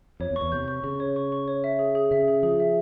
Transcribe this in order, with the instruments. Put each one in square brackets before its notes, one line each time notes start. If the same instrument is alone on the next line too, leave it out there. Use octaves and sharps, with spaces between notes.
[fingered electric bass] F2 [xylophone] C#5
[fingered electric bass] E2
[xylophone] C#6
[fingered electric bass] E2
[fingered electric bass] C3 [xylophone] G6
[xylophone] C#6
[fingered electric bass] C#3 [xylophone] C#6
[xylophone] C#5
C#6
C#6
C#5
E5
G#4
G#4
[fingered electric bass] C#3 [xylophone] E5
[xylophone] G#4
[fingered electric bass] F3 [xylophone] G#4
[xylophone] E5